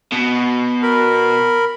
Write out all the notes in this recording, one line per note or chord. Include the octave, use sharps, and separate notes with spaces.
B2
A#4 B5